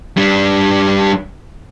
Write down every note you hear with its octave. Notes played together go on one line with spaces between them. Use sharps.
G3 D4